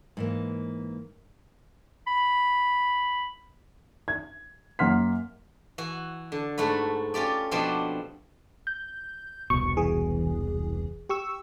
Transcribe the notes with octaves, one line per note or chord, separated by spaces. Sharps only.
G#2 E3 A#3
B5
G#6
F#2 A#3 F#5 C6 F6 B6
E3 F#4
D3
G#2 A3 F#4 B4
C#4 F4 G4 D5
B2 F3 C4 D4 F#4 G4
G6
E1 C2 B2 C#6
E3 G#4
G4 C#6 E6